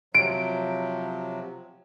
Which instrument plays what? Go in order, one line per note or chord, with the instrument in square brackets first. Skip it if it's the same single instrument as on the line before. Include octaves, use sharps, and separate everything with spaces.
[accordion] C3 F3 F#3 [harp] D7